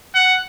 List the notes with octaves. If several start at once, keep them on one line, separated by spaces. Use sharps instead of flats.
F#5